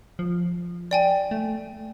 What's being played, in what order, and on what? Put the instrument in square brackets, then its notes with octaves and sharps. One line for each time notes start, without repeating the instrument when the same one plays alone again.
[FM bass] F3
[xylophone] D5 G5 G#5
[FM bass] A3